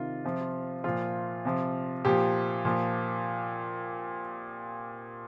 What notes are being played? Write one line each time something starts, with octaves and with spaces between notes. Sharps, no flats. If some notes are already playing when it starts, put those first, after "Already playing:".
Already playing: C3 D#3 F4
C3 F3
A#2 F3 F4
C3 F3
A#2 F3 G4
A#2 F3